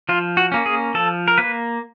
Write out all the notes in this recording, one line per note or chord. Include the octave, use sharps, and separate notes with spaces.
F3 F4
F#4
A#3 C#4
G#4
F3 A4
A#4
A#3 B4